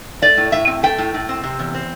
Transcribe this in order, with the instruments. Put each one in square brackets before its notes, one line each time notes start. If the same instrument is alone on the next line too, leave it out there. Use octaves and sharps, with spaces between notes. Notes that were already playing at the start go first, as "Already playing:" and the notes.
[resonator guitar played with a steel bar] A3 D5
A2
A2 E5
C4
A3 G5
A2
A2
C4
C3
E2
C4